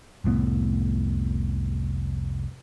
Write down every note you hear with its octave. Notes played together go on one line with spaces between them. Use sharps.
F1 C2 A2 B3